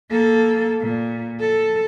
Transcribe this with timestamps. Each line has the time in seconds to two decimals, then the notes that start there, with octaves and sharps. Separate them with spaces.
0.10 A#3 A4
0.81 A#2
1.40 A4